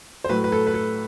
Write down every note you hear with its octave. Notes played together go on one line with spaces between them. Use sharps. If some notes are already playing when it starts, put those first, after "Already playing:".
C5
A2 F#3 A3 B4
B4
A4
B4
A4